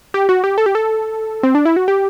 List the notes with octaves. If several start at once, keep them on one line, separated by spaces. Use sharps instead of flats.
G4
F#4
G4
A4
G4
A4
C4
D4
E4
F#4
G4